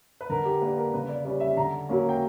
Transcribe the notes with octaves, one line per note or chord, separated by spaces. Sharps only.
B4
D3 A#4
G4
A#3 D4 B4
A#4
C#3 B4
D5
G3 C#4 D5
E5
D3 A#5
F#3 A#3 C#4
G5